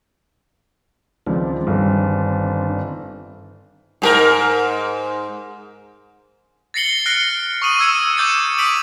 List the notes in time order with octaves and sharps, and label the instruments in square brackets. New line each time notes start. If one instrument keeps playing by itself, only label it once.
[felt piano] C#2 F3 [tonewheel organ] D#3 C4 D4
[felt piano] G1
[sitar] G#2 G4 A#4
[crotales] A6 A#6 C7 C#7 F#7 G7
F6 F#6 A#6 C7 D7 G7
C#6 D#6 D#7 F#7
D6 E6 G#6 C#7
D6 G6 A6 C#7 D#7
D#6 B6 D7 D#7 F#7